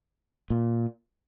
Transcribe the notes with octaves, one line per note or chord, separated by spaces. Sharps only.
A#2